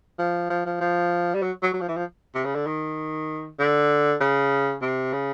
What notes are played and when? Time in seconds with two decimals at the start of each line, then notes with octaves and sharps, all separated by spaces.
0.19 F3
0.50 F3
0.66 F3
0.81 F3
1.34 G3
1.42 F#3
1.63 F#3
1.74 F#3
1.81 F3
1.88 E3
1.97 F3
2.35 C3
2.45 C#3
2.55 D3
2.67 D#3
3.59 D3
4.21 C#3
4.82 C3
5.13 C#3